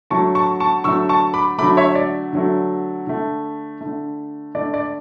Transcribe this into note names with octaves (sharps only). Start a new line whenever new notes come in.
D3 F#3 A3 A5 C#6
A5 C#6
A5 C#6
D3 F#3 A3 C#6 E6
A5 C#6
B5 D6
D3 F#3 A3 B5 D6
C#5 E5
D5
D3 F#3 A3
D3 A3
D3 A3
D3 A3 D5
D5